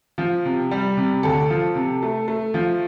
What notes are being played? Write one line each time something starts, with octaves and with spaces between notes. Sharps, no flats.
F3
C3
G3
C3
D2 A4
F3
C3
A3
A3
F3